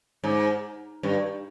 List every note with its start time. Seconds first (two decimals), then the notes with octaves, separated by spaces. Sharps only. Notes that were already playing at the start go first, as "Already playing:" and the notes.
0.24 G#2
1.03 G2